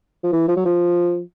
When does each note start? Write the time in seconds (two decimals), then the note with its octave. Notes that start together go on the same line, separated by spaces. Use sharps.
0.23 F3
0.32 E3
0.48 F3
0.56 F#3
0.65 F3